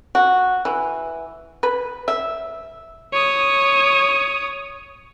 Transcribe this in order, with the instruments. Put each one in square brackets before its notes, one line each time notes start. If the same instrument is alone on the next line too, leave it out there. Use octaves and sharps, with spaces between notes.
[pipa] F#4
E3
B4
E5
[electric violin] C#5 D#6